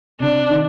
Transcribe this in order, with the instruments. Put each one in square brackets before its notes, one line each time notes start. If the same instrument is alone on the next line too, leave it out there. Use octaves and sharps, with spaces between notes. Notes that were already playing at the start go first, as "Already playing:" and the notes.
[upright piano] C3 [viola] D4
[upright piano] D#3